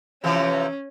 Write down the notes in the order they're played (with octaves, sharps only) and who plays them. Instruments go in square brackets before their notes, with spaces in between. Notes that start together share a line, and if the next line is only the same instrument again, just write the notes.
[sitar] C3 E3 F3 [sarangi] C#4